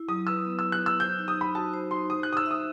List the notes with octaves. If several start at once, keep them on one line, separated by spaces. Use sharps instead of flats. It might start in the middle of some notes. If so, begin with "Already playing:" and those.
Already playing: E4
F#3 D#6
B4 E6
B3
E4 E6
F#6
F#3 E6
C5 G6
D#4
D#6
D#4 B5
F#4 A5
C5
D#4 C6
C5 D#6
D#4 F#6
D#6
E6
E5 D#6